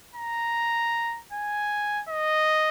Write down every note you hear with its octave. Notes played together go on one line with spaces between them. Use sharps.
A#5
G#5
D#5